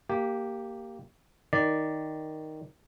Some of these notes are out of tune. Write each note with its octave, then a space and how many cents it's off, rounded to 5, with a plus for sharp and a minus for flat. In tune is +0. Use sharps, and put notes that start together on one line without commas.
A#3 -10 G4 +0
D#3 +0 D5 +0